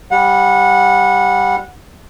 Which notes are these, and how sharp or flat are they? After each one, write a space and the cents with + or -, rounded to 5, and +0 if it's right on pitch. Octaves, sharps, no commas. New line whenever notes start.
G3 +0 F#5 -25